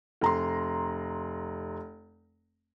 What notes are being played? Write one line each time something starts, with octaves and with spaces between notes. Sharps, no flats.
F1 A#5 C6